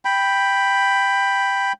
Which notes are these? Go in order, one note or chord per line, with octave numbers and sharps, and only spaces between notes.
G5 B5